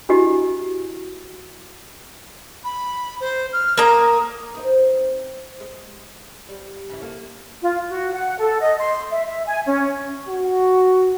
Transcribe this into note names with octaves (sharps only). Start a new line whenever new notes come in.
D4 E4 F#4 G4 D#5
B5
C5
F6
A#3 A#5 D#6
C4 D#4 B4
G#3
G3
C#3 E3 E4
A#3 A4
F4
F#4
F#5
A4
D#5
C6
E5
E5
G#5
C#4
F#4